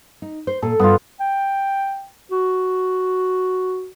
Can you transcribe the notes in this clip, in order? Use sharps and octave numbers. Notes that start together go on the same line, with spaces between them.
D#4
C5
A#2 A4
G2 B3 D4 F4
G5
F#4